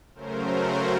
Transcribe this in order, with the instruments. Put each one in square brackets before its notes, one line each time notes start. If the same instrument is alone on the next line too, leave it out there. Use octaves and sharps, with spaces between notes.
[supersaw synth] C#3 F#3 A3 C#4 A#4 C5
F#4